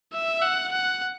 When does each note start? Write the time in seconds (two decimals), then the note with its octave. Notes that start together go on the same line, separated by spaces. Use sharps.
0.13 E5
0.42 F#5
0.72 F#5